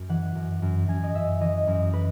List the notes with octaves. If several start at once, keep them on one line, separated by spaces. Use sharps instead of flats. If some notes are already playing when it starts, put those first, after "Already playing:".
Already playing: F#2
E3 F#5
F#2
F#2
F#2 G#5
D#5
F#2 E5
E3 D#5
F#2
B4